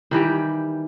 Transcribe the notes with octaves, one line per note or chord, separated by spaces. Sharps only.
D#3 E3 G3 G4